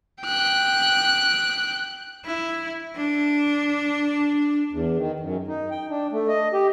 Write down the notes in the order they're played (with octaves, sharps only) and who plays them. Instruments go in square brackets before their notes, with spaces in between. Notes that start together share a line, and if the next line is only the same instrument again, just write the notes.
[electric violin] G5 F#6
[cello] E4
D4
[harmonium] E2
D#3
F#2
D#4
G5
D4
A3
D#5
G4